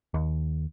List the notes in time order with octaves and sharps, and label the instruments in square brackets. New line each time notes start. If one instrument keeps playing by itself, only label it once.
[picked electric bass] D#2